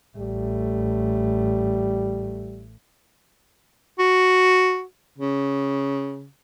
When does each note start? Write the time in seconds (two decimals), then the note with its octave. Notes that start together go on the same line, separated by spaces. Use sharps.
0.17 A1 G3 A3
3.99 F#4
5.18 C#3